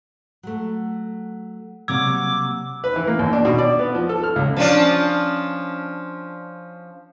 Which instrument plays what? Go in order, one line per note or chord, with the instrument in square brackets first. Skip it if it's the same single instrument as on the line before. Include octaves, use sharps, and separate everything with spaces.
[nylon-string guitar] F#3 A3
[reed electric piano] C3 G#6 [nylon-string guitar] F#3 G3 A#3 [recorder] D6 [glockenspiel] E6
[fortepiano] B4
E3
A#3
D#2
D4
B2
D5
B3
F3
A4
F6
C#2
[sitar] F3 C#4 D4